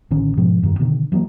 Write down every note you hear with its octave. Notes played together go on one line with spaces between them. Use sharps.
A1 D3 D#3 C#4
G#2 B2 F3 G#3
F1 G2 D#3
B2 D3 D#3
E3 F#3 A3 A#3